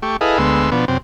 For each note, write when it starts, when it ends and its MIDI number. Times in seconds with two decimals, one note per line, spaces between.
0.02 0.17 57
0.02 0.17 67
0.02 0.17 85
0.21 0.38 64
0.21 0.38 68
0.21 0.38 69
0.21 0.38 71
0.21 0.38 75
0.21 0.38 77
0.38 0.70 38
0.38 0.70 56
0.38 0.70 59
0.38 0.70 84
0.38 0.70 88
0.72 0.85 47
0.72 0.85 53
0.72 0.85 59
0.72 0.85 62
0.88 0.98 42
0.88 0.98 48
0.88 0.98 60